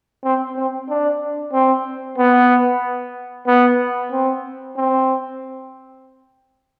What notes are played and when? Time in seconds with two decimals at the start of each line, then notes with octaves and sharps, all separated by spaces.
0.24 C4
0.57 C4
0.89 D4
1.53 C4
2.18 B3
3.47 B3
4.11 C4
4.76 C4